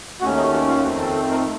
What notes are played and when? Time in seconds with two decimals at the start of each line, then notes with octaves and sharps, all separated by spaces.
0.21 D#2 D#3 A3 C#4 F#4
0.37 D#4
0.52 F#4
0.68 F4
0.83 F2 D#3 A3 C4 F#4
1.00 A4
1.15 A4
1.31 A#4